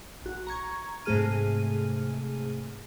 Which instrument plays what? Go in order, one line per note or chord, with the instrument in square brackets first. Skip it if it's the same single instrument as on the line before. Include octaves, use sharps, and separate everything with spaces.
[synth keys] A#1 F#4
A#5 C#6 G#6
G#2 C3 A3 G#4 F6 D#7